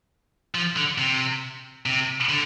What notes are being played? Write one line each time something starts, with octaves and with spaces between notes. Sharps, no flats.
F3
D3
C3
C3
D3